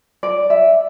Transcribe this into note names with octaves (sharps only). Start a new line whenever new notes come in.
D5
E5